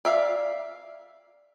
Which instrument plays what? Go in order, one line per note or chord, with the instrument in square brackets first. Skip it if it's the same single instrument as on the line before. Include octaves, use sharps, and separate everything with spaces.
[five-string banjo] D5 E5 F5